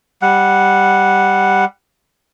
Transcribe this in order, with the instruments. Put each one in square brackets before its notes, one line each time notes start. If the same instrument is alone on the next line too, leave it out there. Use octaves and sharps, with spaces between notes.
[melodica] G3 F#5